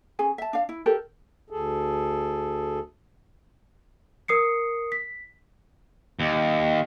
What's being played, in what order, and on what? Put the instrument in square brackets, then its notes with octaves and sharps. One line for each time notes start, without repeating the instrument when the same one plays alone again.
[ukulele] C#4 G#4 G#5
E5 A5
D4 F5
E4
G4 A4 A#4
[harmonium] D2 G#4 A4
[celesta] A#4 D#6 C7 C#7
B6
[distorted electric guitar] D#2